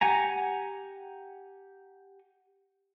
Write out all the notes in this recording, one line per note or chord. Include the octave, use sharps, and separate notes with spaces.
G4 F#5 G#5 A#5